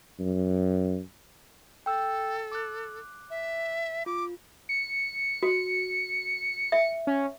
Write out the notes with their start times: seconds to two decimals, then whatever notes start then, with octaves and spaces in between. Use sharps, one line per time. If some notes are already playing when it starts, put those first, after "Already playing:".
0.20 F#2
1.86 A4 G5 E6
2.52 D6 F#6
3.30 E5
4.06 F4 D6
4.69 C#7
5.43 F#4
6.72 E5
7.07 C#4